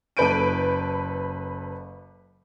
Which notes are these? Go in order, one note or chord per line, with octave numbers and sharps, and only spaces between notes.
F#1 A4 B4 G6 D7 D#7